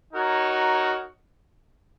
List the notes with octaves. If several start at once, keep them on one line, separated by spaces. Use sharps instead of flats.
D#4 F#4 A#4 C#5